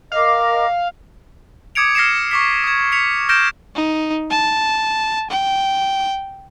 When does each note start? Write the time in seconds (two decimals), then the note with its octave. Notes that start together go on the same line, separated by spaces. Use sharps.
0.12 A#4 D#5 F5 D6
1.75 D6 D#6 G#6 C#7 D7 F7
1.95 F6 A#6 C7 C#7 E7
2.31 C#6 D6 B6
2.64 D#6 G#6
2.92 B6 C#7 F7
3.29 F6 G6 A#6 D7 E7
3.76 D#4
4.31 A5
5.31 G5